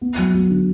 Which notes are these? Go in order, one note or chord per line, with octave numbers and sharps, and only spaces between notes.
B3
F#3
F#3
D3